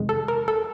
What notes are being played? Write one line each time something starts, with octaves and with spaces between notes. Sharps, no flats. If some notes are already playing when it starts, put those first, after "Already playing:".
Already playing: F2 C3 D#3 G#3
A4
A#4
A4